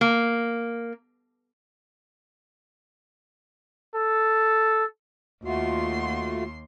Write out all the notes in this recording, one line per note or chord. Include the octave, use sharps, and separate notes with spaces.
A#3
A4
D#2 A3 F4 F#4 C6